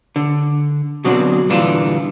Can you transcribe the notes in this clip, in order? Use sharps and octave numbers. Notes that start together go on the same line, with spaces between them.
D3
B2 D3 F#3 C4 D4 F#4
G2 A#2 D3 E3 D4 F4